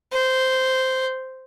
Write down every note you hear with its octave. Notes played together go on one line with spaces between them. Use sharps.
C5